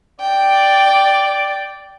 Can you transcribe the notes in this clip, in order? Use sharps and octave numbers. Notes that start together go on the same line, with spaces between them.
D5 G5